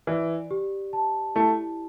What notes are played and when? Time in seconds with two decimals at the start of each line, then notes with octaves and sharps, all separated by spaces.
0.07 E3 D5
0.51 G4
0.93 A5
1.35 A3 E4